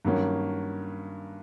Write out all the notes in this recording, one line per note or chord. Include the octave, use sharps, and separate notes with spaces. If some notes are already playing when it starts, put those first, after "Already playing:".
G2 D#3 F#3 A#3 C#4